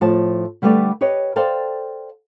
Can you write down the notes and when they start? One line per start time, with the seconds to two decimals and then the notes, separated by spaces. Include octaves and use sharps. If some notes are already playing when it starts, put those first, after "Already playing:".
0.01 A2 F3 A5
0.62 D3 G3 A3 G4 B4 D5
1.01 G4 B4 C#5 D#5
1.36 A4 C5 D5 F5 G5 A5